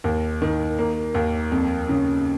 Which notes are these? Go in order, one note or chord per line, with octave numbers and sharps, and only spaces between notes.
D#2
D#3
A#3
D#2
F2
C#3